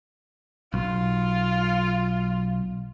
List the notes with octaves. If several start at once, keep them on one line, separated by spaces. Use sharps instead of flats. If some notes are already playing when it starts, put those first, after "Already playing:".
B1 F4